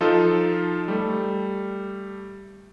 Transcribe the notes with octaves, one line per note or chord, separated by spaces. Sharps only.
F3 D#4 F4 A4
G3 A3